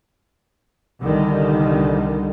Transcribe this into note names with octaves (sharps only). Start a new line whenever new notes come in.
C2 D3 D#3 G3